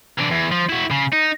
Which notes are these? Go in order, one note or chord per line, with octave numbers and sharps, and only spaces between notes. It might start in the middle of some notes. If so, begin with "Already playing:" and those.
E3 D4
E2
F3
E4 F#4
C#3
D#4